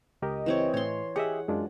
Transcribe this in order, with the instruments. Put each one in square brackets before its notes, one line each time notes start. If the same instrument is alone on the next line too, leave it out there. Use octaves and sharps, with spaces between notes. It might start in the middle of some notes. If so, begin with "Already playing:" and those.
[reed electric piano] C#2 G4 A#4 [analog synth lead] D#5
[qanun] E3 C4 C#5
[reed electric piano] A2 [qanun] C#5 C6
[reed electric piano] G4 D#5 E5 [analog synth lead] G#4 [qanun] F#5
[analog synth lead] F#2 [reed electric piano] G#3 D4 F4